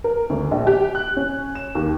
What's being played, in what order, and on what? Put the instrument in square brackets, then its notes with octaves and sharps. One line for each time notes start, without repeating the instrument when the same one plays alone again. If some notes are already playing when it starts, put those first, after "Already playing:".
[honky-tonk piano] A#4
D2
A#1
G4
F#6
C#4
E7
D#2